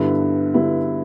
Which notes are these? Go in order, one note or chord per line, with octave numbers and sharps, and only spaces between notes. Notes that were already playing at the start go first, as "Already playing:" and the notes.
Already playing: G2 D3 B3 E4
G2 D3 B3 E4